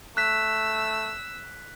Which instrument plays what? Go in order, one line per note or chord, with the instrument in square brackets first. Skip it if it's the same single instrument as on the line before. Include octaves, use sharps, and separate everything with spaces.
[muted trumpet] A3 [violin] E6 [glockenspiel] F#6 B6